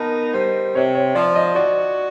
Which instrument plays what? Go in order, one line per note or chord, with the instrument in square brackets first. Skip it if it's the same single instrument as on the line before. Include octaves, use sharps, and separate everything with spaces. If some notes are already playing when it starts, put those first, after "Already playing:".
Already playing: [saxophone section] B3 D#4 [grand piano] A#4 D#5 A5
[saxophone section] G3 [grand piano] C5
[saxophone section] C3 [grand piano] C#5
[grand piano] C#5
[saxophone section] F3 [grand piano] D5
[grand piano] D#5
[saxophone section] F#4 [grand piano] D5